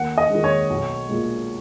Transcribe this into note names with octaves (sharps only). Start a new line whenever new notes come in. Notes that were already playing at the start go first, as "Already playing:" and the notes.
Already playing: D#2 F#5
D#5
D#3 G#3
C#5
B1
A#2 G#3